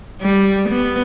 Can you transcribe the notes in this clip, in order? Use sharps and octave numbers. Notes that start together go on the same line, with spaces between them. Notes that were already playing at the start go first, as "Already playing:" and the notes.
G3
B3